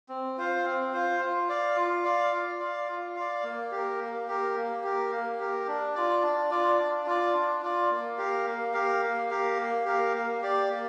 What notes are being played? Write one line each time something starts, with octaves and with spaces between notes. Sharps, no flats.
C4
F4 C5 F5
C4
F4 C5 F5
F4
D5 F5
F4
D5 F5
F4
D5 F5
F4
D5 F5
A#3
G4 A#4
A#3
G4 A#4
A#3
G4 A#4
A#3
G4 A#4
D4
F4 D5
D4
F4 D5
D4
F4 D5
D4
F4 D5
A#3
G4 A#4 F5
A#3
G4 A#4 F5
A#3
G4 A#4 F5
A#3
G4 A#4 F5
A#3
G4 D5
A#3